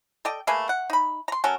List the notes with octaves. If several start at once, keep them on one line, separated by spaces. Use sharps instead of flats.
A4 D5 D#5 G5
A3 A#3 G#4 B4
F#5
D#4 B5
A#5 C6
F#3 C#4 A4 A#4